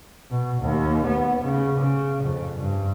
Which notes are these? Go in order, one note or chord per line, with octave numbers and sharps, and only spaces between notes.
B2
D#2
B3
C#3
C#3
F2
G2